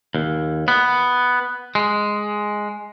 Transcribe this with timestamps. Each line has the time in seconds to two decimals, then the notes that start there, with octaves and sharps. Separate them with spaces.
0.15 D#2
0.68 B3
1.75 G#3